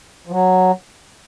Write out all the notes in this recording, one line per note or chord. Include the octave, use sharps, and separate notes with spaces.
F3
F#3